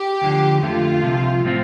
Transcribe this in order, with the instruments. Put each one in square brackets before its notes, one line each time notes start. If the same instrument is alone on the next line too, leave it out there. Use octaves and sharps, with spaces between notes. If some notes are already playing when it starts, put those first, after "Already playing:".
Already playing: [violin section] G4
[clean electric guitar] D2 D3 F3
[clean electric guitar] F2 D3 A3 [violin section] F4
[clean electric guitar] C2 C3 F3
A2 F3 C4 F4